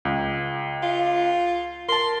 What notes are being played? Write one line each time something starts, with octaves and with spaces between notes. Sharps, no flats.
C#2
F4
A#4 A5 C6